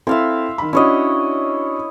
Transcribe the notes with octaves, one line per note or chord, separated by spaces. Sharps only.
C4 E4 A4 E5 F5 C6
D#3 B5
C#4 D4 E4 F#4 C#5 D#5